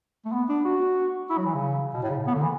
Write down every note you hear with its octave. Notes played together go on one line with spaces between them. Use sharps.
A3
B3
D4
F#4
E4
F#3
E3
C#3
B2
A2
C#3
B3
D3
E3